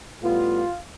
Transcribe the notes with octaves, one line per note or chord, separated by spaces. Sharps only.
A2 G3 B3 F4